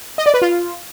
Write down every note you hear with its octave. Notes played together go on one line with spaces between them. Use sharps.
D#5
D5
B4
F4